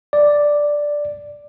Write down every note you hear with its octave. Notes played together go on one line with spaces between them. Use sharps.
D5